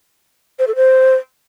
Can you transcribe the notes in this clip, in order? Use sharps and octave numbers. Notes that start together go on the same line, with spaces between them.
C5
A4
C5